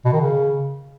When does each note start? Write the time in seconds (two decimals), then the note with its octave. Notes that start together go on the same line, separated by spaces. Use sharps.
0.05 B2
0.13 D#3
0.21 C#3